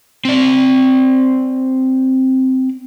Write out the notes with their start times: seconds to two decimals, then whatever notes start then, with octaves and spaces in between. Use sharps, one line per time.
0.25 C4 D5